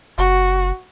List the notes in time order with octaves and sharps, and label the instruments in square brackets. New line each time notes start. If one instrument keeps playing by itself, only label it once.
[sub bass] F#1 [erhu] F#4